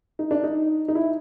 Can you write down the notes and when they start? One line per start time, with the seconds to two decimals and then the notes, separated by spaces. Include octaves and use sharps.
0.19 D#4
0.31 D4
0.44 D#4
0.88 D#4
0.95 E4